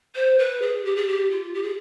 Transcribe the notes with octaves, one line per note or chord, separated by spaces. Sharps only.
C5
B4
G#4
G4
G#4
G4
F4
G4
G#4